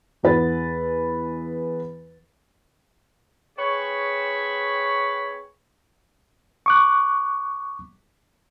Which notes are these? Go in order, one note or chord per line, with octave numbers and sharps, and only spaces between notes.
E2 B3 E4 B4 A6
C4 G#4 B4 C#5
C#6 D6 F#6